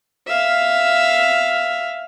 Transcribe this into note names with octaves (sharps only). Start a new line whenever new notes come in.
E5 F5